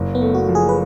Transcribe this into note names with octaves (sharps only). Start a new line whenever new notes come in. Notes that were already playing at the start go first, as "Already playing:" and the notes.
Already playing: F#1
B3
A3
F#4
F3
G#4
B4